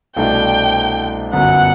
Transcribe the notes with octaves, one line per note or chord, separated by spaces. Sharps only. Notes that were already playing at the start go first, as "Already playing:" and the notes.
C2 B2 A3 D4 G5
G1 F#2 F#3 B3 F#5